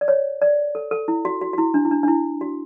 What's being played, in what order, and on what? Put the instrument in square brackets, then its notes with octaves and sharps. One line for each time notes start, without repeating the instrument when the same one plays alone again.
[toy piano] D5
C#5
D5
A4
A4
E4
F#4
F#4
F#4
E4
D4
E4
D4
D4
E4
F#4